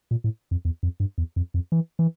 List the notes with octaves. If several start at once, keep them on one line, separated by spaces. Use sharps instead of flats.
A#2
A2
F2
E2
F2
G2
E2
F2
F2
E3
E3